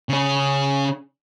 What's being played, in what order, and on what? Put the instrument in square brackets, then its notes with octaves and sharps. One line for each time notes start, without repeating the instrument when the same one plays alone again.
[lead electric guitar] C#3 C#4